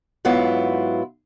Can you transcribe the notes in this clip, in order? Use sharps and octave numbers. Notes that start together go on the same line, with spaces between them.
G#2 F#3 B3 E4 F4